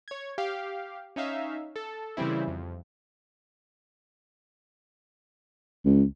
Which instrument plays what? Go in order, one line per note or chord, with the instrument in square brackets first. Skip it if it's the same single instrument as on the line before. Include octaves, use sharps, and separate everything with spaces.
[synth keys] C#5 G#6
G4 F5
C#4 D#4 E5 F5
A4
C#3 E3 G3 C4 E4
F2
[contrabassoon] C#2